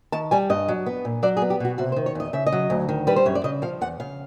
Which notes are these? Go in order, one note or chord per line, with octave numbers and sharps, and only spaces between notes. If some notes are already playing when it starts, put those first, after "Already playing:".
D#3 A5
G3 G#5
G2 D#5
F#3
B3
A#2
F#3 D5
G#4
B3
G4
B2 F#4
C3 F#4
C5
D#3
C#5
E2 D#5
C#3 E5
D#5
F#3
D2
D#3
G3 B4
C5
F#2 C#5
D5
C#3 D#5
F3 F5
E2 F#5
C#3 F5